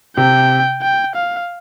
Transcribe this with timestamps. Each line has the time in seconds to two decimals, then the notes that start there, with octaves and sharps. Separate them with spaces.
0.17 C3 G5
0.82 G5
1.16 F5